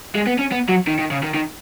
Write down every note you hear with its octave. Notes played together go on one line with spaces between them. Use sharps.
G#3
B3
C#4
B3
F#3
D#3
D#3
C#3
D#3
D#3